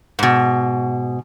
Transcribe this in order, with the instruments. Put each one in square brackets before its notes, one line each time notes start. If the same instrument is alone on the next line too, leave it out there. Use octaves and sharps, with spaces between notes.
[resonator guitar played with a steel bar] G#2 B2